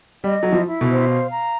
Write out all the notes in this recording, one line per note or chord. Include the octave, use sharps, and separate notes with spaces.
G3 D#5
F#3 E4
F3
E4
B2
C5
F5
A#5